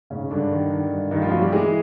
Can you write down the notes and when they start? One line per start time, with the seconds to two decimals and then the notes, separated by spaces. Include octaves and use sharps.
0.10 G#2 C#3 C#4
0.31 G2 D3 D4
0.51 D#3
0.71 D#3
0.92 G2
1.11 G2 D#3 D#4
1.22 F3 F4
1.31 E3 F#3 F#4
1.42 G3 G4
1.52 E3 G#3 G#4